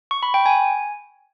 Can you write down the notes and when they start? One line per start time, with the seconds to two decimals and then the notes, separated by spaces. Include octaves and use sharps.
0.11 C#6
0.23 B5
0.34 G5
0.46 G#5